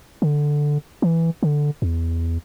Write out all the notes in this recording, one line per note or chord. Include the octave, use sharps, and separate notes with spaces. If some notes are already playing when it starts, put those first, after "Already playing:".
D3
E3
D3
E2